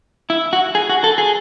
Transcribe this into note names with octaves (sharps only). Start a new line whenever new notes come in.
E4
F#4
G#4
F#4
A4
G#4